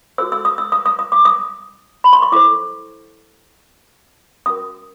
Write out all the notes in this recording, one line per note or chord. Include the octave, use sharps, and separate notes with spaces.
F#4 A4 C5 E6
E6
D#6
E6
D#6
D#6
D#6
D6
D#6
B5
C6
C#6
E4 A4 C5 D6
C#4 F#4 A#4 D#6